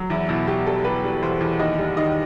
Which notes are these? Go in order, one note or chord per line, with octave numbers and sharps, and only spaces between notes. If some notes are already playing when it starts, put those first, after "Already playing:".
Already playing: F#3
E2 E4
B2 E4
B2 G4
G3 A4
G3 B4
G3
E2 C5
E2
D#2 D#5
G3
D#3 D#5